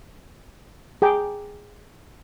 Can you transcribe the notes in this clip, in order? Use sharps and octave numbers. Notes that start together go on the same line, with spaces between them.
G#4 G5 A#5 D6